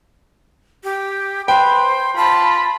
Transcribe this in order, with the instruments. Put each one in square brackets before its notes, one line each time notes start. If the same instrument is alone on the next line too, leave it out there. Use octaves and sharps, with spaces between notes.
[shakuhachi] G4
[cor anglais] B4 [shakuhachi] C5 [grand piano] G5
[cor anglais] F4 [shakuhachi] A5 [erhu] B5